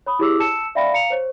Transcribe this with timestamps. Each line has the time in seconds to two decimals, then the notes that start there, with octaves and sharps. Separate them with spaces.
0.06 C#5 B5 D#6
0.19 E4 G4 G#4 C#5 D6 E6
0.40 A5 E6 C#7 E7
0.75 D5 E5 F5 G5 B5 A#6
0.92 F5 A#5 C#7 F7
1.10 C5 C#5